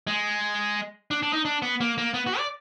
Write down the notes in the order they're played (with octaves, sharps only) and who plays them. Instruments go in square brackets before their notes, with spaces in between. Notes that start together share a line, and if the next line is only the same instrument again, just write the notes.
[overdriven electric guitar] G#3
D4
D4
D#4
D4
B3
A#3
A#3
B3
F#4
D5